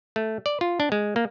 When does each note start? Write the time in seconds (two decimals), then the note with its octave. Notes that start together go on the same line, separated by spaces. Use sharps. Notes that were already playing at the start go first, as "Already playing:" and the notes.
0.16 A3
0.46 D5
0.61 F4
0.80 D4
0.92 G#3
1.16 A#3